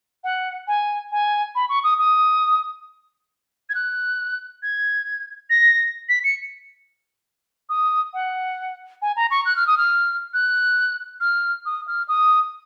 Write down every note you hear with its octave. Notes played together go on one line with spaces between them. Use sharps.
F#5
G#5
G#5
B5
C#6
D#6
D#6
G#6
F#6
G#6
A#6
B6
C#7
D#6
F#5
G#5
A#5
C#6
F#6
F6
D#6
F6
F#6
F6
D#6
F6
D#6